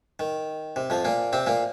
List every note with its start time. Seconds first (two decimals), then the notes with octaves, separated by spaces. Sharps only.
0.19 D#3
0.76 C3
0.90 F2 F3
1.05 A#2 A#3
1.33 C3 C4
1.47 A#2 A#3